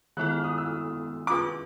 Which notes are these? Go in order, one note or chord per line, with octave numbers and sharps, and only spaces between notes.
D#3 G#3 B3 E4 A4 F#6
F6
D#6
E6
C#4 F4 G#4 B4 D6